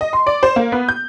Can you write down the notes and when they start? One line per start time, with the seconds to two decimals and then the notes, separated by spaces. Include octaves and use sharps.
0.01 D#5
0.13 C6
0.26 D5
0.43 C5
0.56 A#3
0.72 B3
0.89 G6